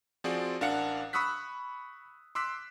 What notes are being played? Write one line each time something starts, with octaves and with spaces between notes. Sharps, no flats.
F3 C4 F#4 G#4 D5
A1 D4 A#4 F5 F#5 C#7
B5 C#6 D#6 E6 F#6 B6
C6 D6 E6 F#6 B6